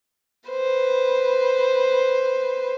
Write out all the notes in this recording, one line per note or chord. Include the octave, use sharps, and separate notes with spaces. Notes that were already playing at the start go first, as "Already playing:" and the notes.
B4 C5